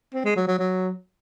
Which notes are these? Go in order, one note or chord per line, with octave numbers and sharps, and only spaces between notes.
C4
G#3
F#3
F#3
F#3